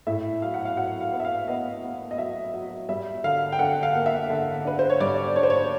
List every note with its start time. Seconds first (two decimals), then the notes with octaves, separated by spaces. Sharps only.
0.07 A2 E5
0.42 F#3 F5
0.54 F#5
0.65 F5
0.77 F#3 F#5
1.01 F5
1.13 B3
1.20 E5
1.25 F5
1.48 B3 D#5
1.83 B3
2.11 D#5
2.18 F#3 E5
2.54 F#3
2.89 G3 E5
3.24 D3 F5
3.52 G5
3.59 D3 F#5
3.83 F5
3.95 A#3
4.06 E5
4.30 D3
4.65 D4 B4
4.79 C5
4.90 C#5
5.00 G3 D5
5.36 D4 C#5
5.43 C5
5.50 C#5